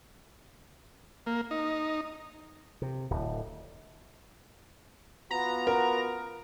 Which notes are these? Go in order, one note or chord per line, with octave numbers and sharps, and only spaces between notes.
A#3
D#4
C3
D1
B3 F4 F#4 A#5
A#4